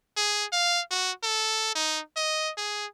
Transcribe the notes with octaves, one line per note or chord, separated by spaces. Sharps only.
G#4
F5
F#4
A4
D#4
D#5
G#4